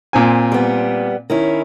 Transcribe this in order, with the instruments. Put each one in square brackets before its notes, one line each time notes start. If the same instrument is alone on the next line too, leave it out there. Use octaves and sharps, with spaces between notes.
[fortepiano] A#2 C4 G#5
[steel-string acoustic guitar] G3 B3
D#3 C#4 E4